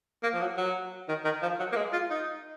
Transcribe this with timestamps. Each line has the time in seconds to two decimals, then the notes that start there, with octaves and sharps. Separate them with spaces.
0.23 A#3
0.34 F3
0.41 F#3
0.57 F#3
1.09 D#3
1.25 D#3
1.43 F3
1.59 F#3
1.72 A#3
1.76 G#3
1.93 F4
2.10 D#4